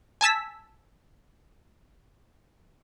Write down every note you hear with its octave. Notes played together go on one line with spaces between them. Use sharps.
G#5 A5 E6 B6